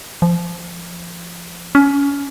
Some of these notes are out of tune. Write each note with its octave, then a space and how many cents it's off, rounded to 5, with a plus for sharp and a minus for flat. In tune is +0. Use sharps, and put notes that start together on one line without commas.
F3 -20
C#4 +25